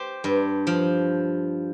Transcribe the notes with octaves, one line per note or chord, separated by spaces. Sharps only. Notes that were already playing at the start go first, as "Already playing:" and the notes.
Already playing: G4 C5
G2
F3